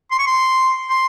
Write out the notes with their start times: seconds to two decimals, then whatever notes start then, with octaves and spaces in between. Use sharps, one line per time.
0.11 C6
0.19 C#6
0.27 C6
0.90 C6